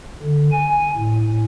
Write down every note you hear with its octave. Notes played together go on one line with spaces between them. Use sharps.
D3
G#5
A2